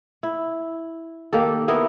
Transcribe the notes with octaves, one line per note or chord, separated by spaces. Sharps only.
E4
D#3 A#3 G4 A4
B3 E4 A#4 D#5